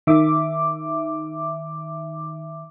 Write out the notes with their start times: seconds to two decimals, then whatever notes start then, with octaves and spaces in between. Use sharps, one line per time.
0.07 D#3 E5 D6